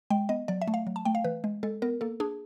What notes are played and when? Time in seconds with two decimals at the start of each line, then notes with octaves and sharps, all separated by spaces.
0.10 G#3 G5
0.29 B3 D#5
0.48 F#3 D5
0.62 E5
0.68 A3
0.74 F5
0.87 F#3
0.96 A5
1.05 A3 G5
1.15 F5
1.24 E3 B4
1.44 G#3
1.63 G#3 A4
1.82 B3 A#4
2.01 A#3 A4
2.20 D4 G#4